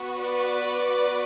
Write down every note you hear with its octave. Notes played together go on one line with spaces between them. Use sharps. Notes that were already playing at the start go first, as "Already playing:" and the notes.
Already playing: B3 F#4
B4 D5